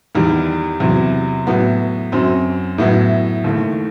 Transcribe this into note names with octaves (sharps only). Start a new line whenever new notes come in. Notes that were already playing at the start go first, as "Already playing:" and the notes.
E2 D#3 G3
E2 C3 F#3
A2 F#3 B3
F#2 F#3 C4
A2 F#3 B3 E4
D#2 D#3 A3 E4